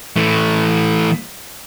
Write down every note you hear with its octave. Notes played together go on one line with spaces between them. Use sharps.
E3 A3